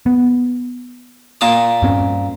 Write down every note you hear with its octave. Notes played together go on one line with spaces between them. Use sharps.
B3
A#2 A5 D#6
G2 C4 C#4